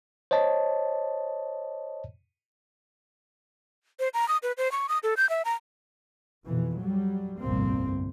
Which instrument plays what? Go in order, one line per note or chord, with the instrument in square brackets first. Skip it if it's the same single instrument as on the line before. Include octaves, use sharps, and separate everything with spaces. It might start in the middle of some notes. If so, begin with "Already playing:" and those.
[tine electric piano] C5 C#5 D#5 A5
[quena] C5
A#5
D#6
B4
C5
C#6
D#6
A4
G6
E5
A#5
[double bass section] F2 B2 E3
F#3 G3
G1 C2 F2 A#2 A#3 C4